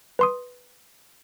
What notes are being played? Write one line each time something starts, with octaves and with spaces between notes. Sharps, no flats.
B4 C6 D#6